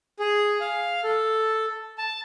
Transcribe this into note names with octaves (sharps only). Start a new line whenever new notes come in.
G#4
F5
A4
A5